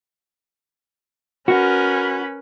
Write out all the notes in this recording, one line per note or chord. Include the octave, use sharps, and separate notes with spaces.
C#4 F#4 A#4 B4